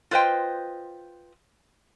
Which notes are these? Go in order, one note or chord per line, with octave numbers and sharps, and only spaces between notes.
F4 B4 C5 D#5 G5